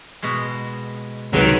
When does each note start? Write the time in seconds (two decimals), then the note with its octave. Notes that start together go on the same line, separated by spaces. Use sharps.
0.22 B2 G#3
1.33 C#2 C3 D#3 F#3 G#3 B4